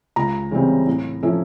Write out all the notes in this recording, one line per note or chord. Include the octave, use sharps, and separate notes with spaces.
C#2 A#5
C#3 E3 G3 C4
A2
F3 A3 C#4 E4